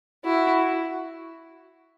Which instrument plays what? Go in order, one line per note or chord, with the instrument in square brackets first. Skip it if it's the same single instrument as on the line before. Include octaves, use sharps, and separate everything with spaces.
[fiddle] E4 [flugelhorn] F#4